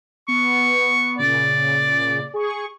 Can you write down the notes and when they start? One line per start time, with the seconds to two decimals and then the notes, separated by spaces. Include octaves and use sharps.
0.28 B3 C#6
1.19 A#2 C#3 D5
2.34 G#4 C#6